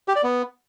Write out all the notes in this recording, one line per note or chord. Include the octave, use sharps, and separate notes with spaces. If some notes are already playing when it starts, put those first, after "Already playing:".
G4
D5
B3